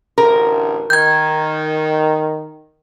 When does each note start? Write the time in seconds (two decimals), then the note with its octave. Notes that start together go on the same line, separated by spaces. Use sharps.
0.18 A1 D2 A#4
0.90 D#3 G6 G#6